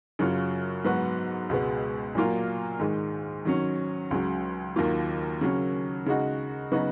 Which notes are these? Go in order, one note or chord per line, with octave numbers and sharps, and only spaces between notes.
F#2 C#3 F#3 C#4 F4
G#2 F#3 B3 F#4
C#2 B2 G#3 B3
A#2 F#3 A#3 F4
G#2 D#3 G#3
D#3 F#3 C#4
C#2 C#3 F#3
D#2 D#3 F#3 A#3 F4
C#3 F#3 C#4
C#3 G#3 D#4 F#4
C#3 F#3 B3 D#4 F#4